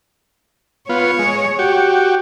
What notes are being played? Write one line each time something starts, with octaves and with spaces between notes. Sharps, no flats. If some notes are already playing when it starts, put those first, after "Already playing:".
B3 F4 C#5
G#3
F#4 G4